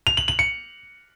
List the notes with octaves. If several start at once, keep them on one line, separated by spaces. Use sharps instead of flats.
F7
F#7
F#7
C#7